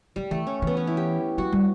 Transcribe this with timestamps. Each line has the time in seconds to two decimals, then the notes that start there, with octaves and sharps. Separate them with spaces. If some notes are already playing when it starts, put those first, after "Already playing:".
0.16 F#3 G3
0.31 E3 A3
0.47 C#4
0.62 E3
0.67 B3
0.77 C#4
0.87 E4
0.97 G4
1.38 F#3 F#4
1.52 G3